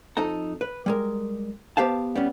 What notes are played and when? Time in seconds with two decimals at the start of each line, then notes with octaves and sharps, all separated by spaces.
0.17 F2 D#4 A4 A#5
0.61 B4
0.86 G3 G#3 A#4
1.77 B3 G4 C5 F5 A5
2.15 G3 B3 C#4